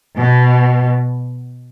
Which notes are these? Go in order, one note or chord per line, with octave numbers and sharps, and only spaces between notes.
B2